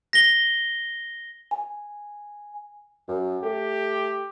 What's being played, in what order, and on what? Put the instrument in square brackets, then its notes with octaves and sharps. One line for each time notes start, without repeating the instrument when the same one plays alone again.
[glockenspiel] A#6 G7
[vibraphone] G#5
[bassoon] F#2
[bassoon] A3 [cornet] G4